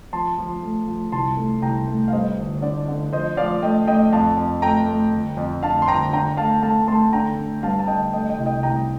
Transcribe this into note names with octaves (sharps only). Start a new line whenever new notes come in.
F3 A5 C6
F3
A3
F3
C2 A5 C6
A3
C2 G5 A#5
A3
F5
G2 C5 D#5
G1
D3 D5
D3
F3 C5 D#5
F3 D5 F5
A3 D#5 G5
A3 D#5 G5
F2 F5 A5
F2
A3 G5 A#5
A3
G1
F2
D3 F5 A5
C6
G1 G5 A#5
D3 G5 A#5
A3 F5 A5
A3 F5 A5
A3 A5 C6
D3 G5 A#5
D3
G2 F5 A5
A5
D3 D#5 G5
A3 D#5 G5
D#5 G5
C2
D#5 G5
C2 G5 A#5